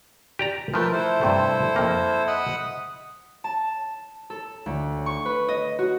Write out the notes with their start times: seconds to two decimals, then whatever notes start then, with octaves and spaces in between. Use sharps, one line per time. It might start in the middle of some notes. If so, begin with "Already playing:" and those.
0.39 G4 D5 A#5
0.74 F3 A3 A#4 B4 G5
0.92 E4 A4 C5
1.21 G2 C3 A3
1.76 F2 A#3
2.27 D#5 F#5 B5
3.44 A5
4.30 A4
4.66 D2
5.06 C#6
5.25 B4
5.48 D#5
5.79 F#4